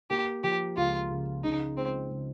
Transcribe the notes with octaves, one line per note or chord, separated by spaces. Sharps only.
A#3 G4
F3 G4
C#2 F4
C#3
C#3 D#4
G#3 C4
C#3